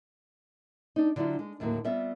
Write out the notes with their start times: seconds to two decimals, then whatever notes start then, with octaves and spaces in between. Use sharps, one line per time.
0.96 D4 D#4
1.16 D3 F#3 D4 E4 F4
1.39 G#3
1.60 D#2 A2 D3 F#3 A#3
1.84 G3 B3 C4 F4 E5